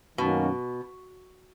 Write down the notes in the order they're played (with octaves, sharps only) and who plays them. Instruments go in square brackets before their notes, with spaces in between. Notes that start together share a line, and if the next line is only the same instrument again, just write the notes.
[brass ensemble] F#2 D#3 A#3 C#4 F#4 [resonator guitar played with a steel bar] B2